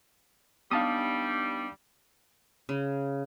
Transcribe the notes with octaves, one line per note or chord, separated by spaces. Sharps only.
G3 B3 D4 D#4 F5 A5 D#6
C#3